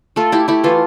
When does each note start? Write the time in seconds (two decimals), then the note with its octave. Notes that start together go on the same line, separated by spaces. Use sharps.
0.16 A3 F4 A4
0.32 A3 E4 G4
0.48 A3 E4 G4
0.64 E3 F4 A4